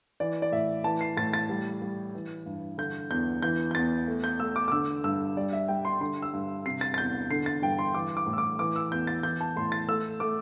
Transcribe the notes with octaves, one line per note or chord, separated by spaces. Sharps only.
E3 D5
D5
A2 E5
E3 A5
C7
A2 A6
A6
G3
G3
E3
G2
D3 G6
E2 G6
E3 G6
G6
E2 A6
A3
G6
A3 E6
D6
D6
D3 E6
G2 E6
G3 D5
E5
G3 G5
C6
D3 C6
E6
G2
C3 C7
A6
A6
E2 G6
D3 C7
A6
G2 G5
C6
E3 D6
D6
A2
E6
D6
E3 D6
E6
E2 G6
A6
E3 G6
A5
A2 C6
A6
A3 E6
A3 D6